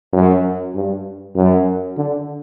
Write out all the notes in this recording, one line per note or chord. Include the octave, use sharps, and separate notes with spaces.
F#2
G2
F#2
D3